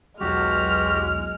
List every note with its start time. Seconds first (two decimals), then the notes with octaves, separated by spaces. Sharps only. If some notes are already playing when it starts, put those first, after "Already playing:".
0.20 B1 E2 F#3 G#3 F#4 G4 F6